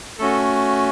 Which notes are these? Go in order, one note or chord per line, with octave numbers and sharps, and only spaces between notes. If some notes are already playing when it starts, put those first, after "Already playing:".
A3 C#4 F#4 A4